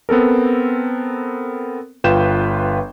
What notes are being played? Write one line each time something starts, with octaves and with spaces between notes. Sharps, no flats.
B3 C4 A4 A#4
G1 F4 B4 G5 G6 E7